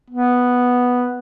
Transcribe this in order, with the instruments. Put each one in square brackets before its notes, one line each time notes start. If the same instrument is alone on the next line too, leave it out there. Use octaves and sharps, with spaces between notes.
[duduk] B3